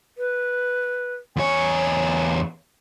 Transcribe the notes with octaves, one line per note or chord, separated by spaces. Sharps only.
B4
E2 C#5 G#5